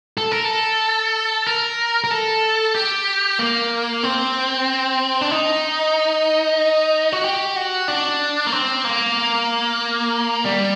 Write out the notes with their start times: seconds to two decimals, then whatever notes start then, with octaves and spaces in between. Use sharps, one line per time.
0.18 A4
0.31 A#4
0.45 A4
1.46 A#4
2.04 A#4
2.11 A4
2.74 G4
3.39 A#3
4.03 C4
5.21 D4
5.31 D#4
7.12 F#4
7.24 G4
7.56 F#4
7.88 D4
8.46 A#3
8.52 C4
8.85 A#3
10.45 G3